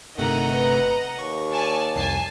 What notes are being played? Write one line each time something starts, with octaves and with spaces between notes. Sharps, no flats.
G1 C3 D#3 A3 D#5 F#5 A#5
B4
D#2 C#6
D5 G#5 A5
C2 F2 G#5 A5 C7